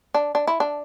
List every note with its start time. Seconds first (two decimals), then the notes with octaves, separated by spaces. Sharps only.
0.14 D4
0.35 D4
0.47 E4
0.60 D4